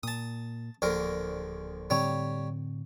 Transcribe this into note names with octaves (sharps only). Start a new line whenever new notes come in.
A#2 A5 D#6
D1 A#1 D3 A#4
A2 D3 G3 C4 C#5